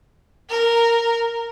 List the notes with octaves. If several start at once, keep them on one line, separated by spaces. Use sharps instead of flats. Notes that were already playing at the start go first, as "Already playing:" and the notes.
A#4